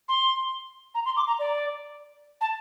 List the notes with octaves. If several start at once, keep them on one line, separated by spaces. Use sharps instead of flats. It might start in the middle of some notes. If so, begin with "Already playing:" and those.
C6
A#5
C6
D6
A#5
D5
A5